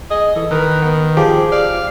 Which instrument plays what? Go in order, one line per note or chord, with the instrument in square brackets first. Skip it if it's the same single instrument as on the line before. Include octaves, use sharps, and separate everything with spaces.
[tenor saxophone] G#4 [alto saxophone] D#5
[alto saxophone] E3 [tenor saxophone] A4
[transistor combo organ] D#3 [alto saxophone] A#4 [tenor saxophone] B4
[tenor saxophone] B3
[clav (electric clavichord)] F3 [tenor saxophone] G4 [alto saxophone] G#4
[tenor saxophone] D5 [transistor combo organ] F5